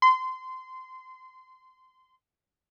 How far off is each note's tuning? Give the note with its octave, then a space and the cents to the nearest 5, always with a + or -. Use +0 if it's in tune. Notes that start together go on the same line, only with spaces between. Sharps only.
C6 -20